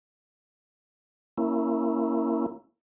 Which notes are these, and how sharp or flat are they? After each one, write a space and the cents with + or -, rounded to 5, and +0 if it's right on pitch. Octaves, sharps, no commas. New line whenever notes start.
A#3 +0 C#4 +0 E4 +0